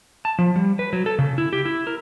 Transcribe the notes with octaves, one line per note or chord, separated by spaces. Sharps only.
A5
F3
G3
B4
F#3
A4
C#3
E4
G4
E4
A#4